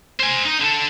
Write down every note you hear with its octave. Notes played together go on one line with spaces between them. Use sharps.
C5 G#5
D#4 D#5
D3 A4